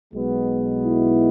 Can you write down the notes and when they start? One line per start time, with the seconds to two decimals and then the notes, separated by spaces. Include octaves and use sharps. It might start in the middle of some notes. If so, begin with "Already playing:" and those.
0.14 B1 B2 G#3 B3
0.84 E4